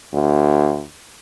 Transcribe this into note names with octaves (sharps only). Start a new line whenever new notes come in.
D2